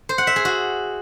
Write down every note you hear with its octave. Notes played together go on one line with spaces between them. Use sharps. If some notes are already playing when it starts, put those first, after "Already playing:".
C5
F#5
E5
G#4
F#4